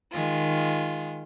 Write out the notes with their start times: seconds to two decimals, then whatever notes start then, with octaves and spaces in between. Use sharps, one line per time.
0.12 D#3 G#3 F4